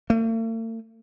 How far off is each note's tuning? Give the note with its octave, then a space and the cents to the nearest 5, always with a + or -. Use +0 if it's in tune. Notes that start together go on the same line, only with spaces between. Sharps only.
A3 +45